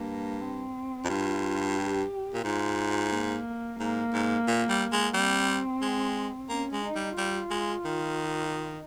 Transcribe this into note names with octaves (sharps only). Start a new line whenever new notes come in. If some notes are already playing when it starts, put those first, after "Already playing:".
Already playing: G2 A#3
C4
F2
G2 F4
G4
A#2
G#2 F4
A#3
G#2 A#3
G#2
A#2
G3
G#3
G3 C4
G#3
A#3 C#4
G#3
D#4
G3
G3 F4
G#3
D#3
D#4